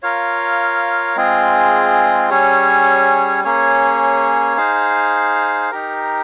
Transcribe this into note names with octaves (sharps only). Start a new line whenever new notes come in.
F4 A#4 C#5 F5
G#3 C4 F4 G#4
G3 C#4 G#4 C#5
A#3 C#4 G#4 C#5
D#4 G#4 C5 F5
D#4 G4 A#4